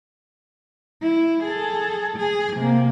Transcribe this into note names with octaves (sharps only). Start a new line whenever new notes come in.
E4
G#4 A4
G#4
C3 A#3